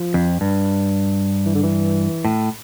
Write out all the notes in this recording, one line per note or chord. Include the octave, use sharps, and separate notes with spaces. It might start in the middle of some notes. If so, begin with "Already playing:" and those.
Already playing: F3
F2
G2
E3
D3
E3
A2